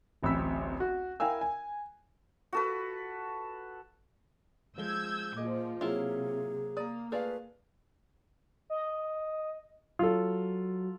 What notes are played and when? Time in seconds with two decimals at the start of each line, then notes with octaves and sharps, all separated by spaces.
0.23 D1 A1 C4 B5 E6 B6
0.80 F#4
1.20 E4 A#4 F5 G5 G#5 E6
1.41 G#5
2.53 F#4 A4 B4
4.78 F3 G#3 E6 G6 G#6 G7
5.37 A#2 F3 G#4 D#5 D6
5.81 C3 F#3 A#3 E4 F4 G#4
6.77 A#3 D5 A#5 D#6
7.12 A3 F4 G#4 B4 D5 F5
8.70 D#5
9.99 F#3 F4 A4